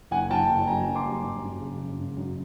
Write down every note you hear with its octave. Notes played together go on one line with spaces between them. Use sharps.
F#1 F#5 G#5
F#1 G5 A5
F#1
F#2 G#5 A#5
F#2
C6 D6
G3
G#1
F#2
C#3
F#2
G#1
F#2